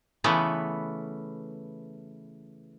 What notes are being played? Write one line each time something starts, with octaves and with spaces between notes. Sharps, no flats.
C#3 E3 A3 B3